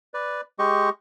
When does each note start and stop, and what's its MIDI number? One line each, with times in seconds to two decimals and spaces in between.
0.14 0.41 71
0.14 0.41 74
0.59 0.90 56
0.59 0.90 67
0.59 0.90 75
0.59 0.90 85